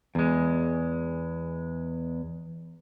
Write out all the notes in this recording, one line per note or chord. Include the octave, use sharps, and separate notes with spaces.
E2 G#3